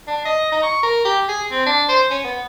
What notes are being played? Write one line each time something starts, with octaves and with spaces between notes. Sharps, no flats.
D4
D#5
D#4
C#6
A#4
G4
G#4
C4
D4
C5
C#4
B3